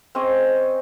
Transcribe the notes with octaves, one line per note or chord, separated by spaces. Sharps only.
C4 C#4 G#4 D#5